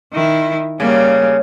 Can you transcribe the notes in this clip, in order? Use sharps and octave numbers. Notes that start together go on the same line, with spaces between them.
D#3 E4
C#3 G3 A#3